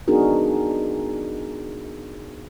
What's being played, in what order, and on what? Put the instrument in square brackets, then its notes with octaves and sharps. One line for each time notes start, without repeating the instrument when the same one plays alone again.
[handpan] B3 D4 D#4 F#4 G#4 A#4